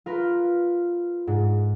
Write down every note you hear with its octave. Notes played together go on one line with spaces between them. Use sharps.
F4 A#4 B4
G#2